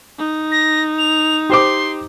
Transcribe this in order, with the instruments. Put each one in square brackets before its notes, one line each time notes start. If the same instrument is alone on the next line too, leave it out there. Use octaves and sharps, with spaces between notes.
[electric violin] D#4
[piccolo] A#6
F7
[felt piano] G4 C5 D6 [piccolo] C6